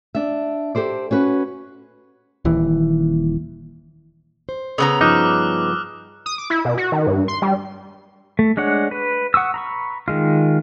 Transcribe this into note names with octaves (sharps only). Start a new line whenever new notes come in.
D4 E5
G4 A4 C5 D5
C#4 F#4 B4
D#1 D#2 E3
C5
C#3 B3 A#5 D#6 E6
G2 F3 D#4 D6 F6 F#6
D#6
D6
E4
B2
F#4
D#3
G2
C6
G3
A3
G#3 D4 C#5 F#5
B4
F#5 C#6 D#6 E6
A#5 B5 C#6
D#3 G#3 F4